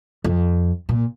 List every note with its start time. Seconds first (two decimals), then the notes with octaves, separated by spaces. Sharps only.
0.24 F2
0.89 A#2